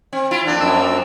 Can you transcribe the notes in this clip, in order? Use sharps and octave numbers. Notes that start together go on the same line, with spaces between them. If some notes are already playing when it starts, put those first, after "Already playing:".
C4
E4 F4
F2 A#3 D4
F#2 E6